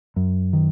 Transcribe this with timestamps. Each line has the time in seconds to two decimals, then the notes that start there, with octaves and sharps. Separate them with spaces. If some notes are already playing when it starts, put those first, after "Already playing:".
0.16 F#2
0.53 D#3